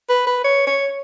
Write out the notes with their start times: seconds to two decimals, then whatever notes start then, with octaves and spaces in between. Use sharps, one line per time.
0.09 B4
0.27 B4
0.44 C#5
0.67 C#5